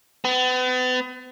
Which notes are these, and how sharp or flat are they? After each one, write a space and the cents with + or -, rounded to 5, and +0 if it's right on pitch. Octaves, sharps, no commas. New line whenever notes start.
B3 +40